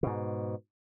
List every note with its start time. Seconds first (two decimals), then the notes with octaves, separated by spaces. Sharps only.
0.03 G#2 B2